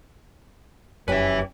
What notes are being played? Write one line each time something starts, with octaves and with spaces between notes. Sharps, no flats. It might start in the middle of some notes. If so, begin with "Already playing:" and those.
F1 F#2 C#4 G4 B4 E5